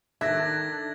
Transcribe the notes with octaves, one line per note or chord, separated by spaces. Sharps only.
D#3 D4 A4 E5 G#6 A#6